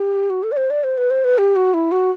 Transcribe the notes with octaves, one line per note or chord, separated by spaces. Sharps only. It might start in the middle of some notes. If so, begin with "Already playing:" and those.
Already playing: G4
F#4
A4
D5
C5
D5
C5
B4
C5
B4
G4
F#4
E4
F#4